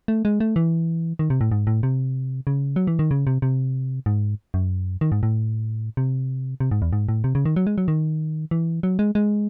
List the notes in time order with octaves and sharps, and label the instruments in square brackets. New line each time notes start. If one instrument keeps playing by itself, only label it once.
[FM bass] A3
G#3
A3
E3
D#3
C3
A2
G#2
A2
C3
C#3
F#3
E3
D#3
C#3
C3
C3
G#2
F#2
D#3
G#2
A2
C3
C3
G#2
E2
G#2
A2
C3
C#3
D#3
F#3
G#3
F#3
D#3
E3
F#3
G#3
G#3